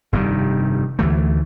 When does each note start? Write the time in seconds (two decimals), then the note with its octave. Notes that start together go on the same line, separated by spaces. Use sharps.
0.13 F1 G2 D#3 G3
0.99 D2 E3 A3